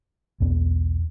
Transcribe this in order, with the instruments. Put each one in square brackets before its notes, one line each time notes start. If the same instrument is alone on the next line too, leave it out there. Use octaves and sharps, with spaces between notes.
[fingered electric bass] B1 E2 B3